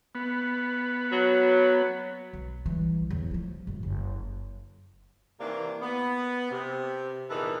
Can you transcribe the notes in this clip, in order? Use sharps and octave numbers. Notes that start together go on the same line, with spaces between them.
B3
F#3
B1
E3 G3
E2 F#3
F3 A3
F2 A3
F#1
C3 D#3 E3 A#3 D4
B3
C3
E2 A#2 D#3 E3 A4 B4